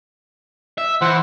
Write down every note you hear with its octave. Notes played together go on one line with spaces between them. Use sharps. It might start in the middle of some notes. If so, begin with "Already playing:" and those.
E5
E3 C5 F#5